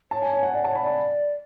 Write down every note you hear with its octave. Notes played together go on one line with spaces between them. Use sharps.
C#5 A5
G#5
G#5
F#5
D5 G#5
C#5 A5
B5
D5
B5